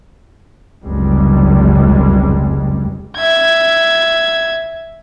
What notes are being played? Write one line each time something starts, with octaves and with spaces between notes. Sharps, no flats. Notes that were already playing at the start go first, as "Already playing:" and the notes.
F1 C#2 F#2 G3 G#3
E5 G#6